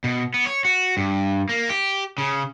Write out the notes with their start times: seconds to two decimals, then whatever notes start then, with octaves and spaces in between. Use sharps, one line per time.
0.04 B2
0.34 B3
0.46 C#5
0.65 F#4
0.97 G2
1.49 A#3
1.69 G4
2.18 C#3